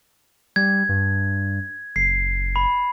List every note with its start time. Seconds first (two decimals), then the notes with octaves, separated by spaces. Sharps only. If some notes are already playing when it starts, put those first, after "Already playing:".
0.56 G3 G#6
0.89 G2
1.96 F#1 C7
2.56 B5